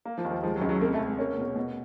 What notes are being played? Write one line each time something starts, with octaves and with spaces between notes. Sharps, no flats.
A#3
F3
D#2
F3
F3 G#3
F#3
C#2
F#3
C3 A#3
A3
C3
G#3
A#3 C#4
B2
B2